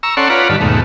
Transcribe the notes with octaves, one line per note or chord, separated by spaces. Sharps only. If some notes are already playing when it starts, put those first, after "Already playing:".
A#5 C#6 E6
C#4 A4 D5 F#5 C6 C#6
F4 B4 C#5 D5 F#5 A#5
G2 D#3 A5 B5
D#2 G#2 B2 A3